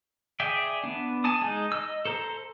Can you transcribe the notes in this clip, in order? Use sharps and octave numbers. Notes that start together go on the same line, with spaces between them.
G#4 D5 E5 G5
B3 D4
G#5 A5 D#6
G#3 D#4
D#5 E6
A4 C5 A#5